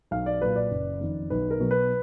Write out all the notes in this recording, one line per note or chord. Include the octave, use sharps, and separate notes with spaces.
B1 F5
D5
A#2 F#3 B4
D5
F#1
F2 D#3
B1 B4
A#4
B2 F#3
B4